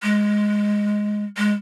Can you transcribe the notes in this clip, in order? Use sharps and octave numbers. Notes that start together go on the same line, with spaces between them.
G#3
G#3